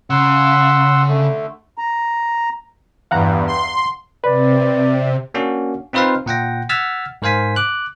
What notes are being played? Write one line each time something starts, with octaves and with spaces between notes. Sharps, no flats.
C#3 F#5 C6 E6
D3 A3
A#5
E2 G2 F5 F#5 A#5
C6
C3 B4 D5
A#3 C#4 D4 F#4
C4 D#4 F4 B4 C5 F5
A#2 F#5 G5 A#6
F#5 E6 F6 G#6 A6 B6
G#2 A#4 C5 F5 G#5 B6
D6 F#6